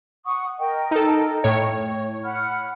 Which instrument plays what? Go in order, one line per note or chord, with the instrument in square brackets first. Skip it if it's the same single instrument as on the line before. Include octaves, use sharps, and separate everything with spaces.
[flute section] F#5 C#6 D#6
A#4 D#5 G5
[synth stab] D#4 A4
A2 C#5
[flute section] F#5 B5 F6